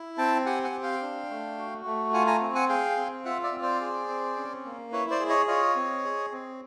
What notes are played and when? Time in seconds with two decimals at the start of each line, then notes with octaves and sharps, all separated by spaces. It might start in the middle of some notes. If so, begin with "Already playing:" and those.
Already playing: E4
0.18 C4 G5 A5
0.46 G4 F#5 G#5
0.64 F#5 G#5
0.74 C4
0.83 F5 G5
1.02 D4
1.30 A3
1.58 F#4
1.85 A3
2.13 F4 F#5 G#5
2.27 G#5 A#5
2.41 C4
2.55 F#5 G#5
2.69 G#4 F5 G5
2.97 C4
3.25 F4 E5 F#5
3.43 D5 E5
3.52 C4
3.62 C5 D5
3.81 G#4
4.08 C4
4.37 C#4
4.65 A#3
4.92 E4 B4 C#5
5.10 C5 D5
5.20 G#4
5.29 C#5 D#5
5.47 F4 C#5 D#5
5.76 C4
6.04 G#4
6.32 C4